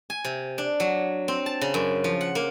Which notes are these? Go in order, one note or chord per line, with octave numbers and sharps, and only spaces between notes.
G#5
C3
D4
F#3
C4
A5
C#3
F#2
F3
F#5
A#3